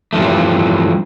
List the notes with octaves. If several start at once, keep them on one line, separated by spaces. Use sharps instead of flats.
G2 E3 F3 A3